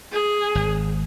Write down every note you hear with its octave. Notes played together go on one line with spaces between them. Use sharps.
G#4
G#1